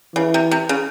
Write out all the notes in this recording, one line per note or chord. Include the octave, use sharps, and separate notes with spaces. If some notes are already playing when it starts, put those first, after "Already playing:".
C#3 E3
C3
C3
C#3